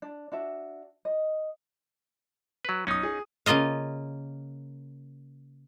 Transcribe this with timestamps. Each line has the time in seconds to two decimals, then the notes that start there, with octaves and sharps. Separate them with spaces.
0.02 D4
0.32 D4 F#4 E5
1.05 D#5
2.65 F#3 B4
2.87 B1 C#4 D#4 D#6
3.03 G#4
3.46 C#3 A#3 F4 D#5 F5